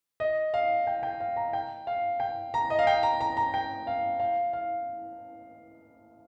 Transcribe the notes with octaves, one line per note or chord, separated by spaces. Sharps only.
D#5
F5
G5
G5
F5
A#5
G5
F5
G5
A#5
D#5
F5
G5
A#5
A#5
A#5
G5
F5
F5
F5